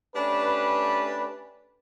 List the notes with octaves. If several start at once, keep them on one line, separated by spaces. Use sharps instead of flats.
A3 C#4 D4 G4 B4